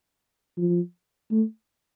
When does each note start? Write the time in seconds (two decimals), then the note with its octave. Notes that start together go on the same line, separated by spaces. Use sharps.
0.58 F3
1.32 A3